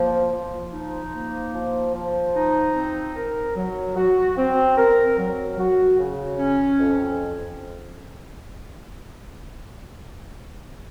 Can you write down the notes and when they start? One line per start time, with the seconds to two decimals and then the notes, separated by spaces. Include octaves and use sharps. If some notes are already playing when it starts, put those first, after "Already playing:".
Already playing: F3 A#3
0.32 F3
0.73 D#4
1.14 A#3
1.54 F3
1.94 F3
2.35 D#4
2.75 C4
3.16 A#4
3.56 F#3
3.96 F#4
4.37 C4
4.77 A#4
5.18 F#3
5.58 F#4
5.98 C#3
6.39 C#4
6.79 F2